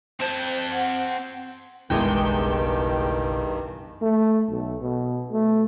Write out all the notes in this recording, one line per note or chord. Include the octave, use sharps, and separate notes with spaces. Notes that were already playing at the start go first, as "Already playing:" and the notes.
C4 C5 A5
F#5
F#1 B1 E2 G2 D#3 E3 G#3 G5
A3
B1
B2
A3